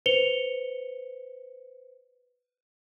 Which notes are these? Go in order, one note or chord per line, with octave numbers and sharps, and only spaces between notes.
B4 C5 C#7 F7 G7